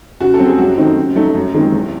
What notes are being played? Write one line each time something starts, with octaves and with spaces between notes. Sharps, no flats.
C#3 F#4
A4
F#3 C4
G#4
F#2 F#4
D#3 A3 C4 D#4
C#3
F#3 A3 D#4
F#2
D#3 G#3 C4
E2